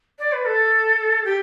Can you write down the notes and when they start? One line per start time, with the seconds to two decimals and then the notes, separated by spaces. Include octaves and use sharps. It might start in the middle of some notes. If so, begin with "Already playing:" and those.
0.19 D5
0.32 B4
0.45 A4
1.25 G4